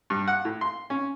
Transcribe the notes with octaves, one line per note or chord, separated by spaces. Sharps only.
G2
F#5
A2
C6
C#4